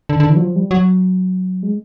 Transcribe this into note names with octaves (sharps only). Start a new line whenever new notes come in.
D3
D3
E3
F#3
F3
G3
F#3
G#3